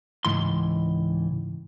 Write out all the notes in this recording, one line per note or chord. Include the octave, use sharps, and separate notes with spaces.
C#2 G#2 E3 C6